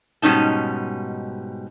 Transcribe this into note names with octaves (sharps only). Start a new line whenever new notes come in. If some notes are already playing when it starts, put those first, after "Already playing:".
G#2 B2 G3 C#4 D#4 A5